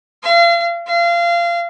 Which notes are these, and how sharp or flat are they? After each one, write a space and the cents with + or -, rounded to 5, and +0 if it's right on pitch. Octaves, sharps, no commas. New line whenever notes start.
F5 -35
F5 -25